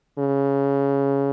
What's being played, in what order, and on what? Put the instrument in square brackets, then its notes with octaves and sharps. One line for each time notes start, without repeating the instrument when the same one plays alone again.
[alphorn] C#3